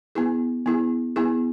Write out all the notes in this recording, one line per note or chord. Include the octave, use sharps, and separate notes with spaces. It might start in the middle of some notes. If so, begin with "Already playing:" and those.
B3 E4 G#4
B3 E4 G#4
B3 E4 G#4